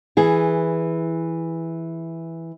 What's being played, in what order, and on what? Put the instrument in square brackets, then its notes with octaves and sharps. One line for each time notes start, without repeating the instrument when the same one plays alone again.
[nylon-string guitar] E3 G#4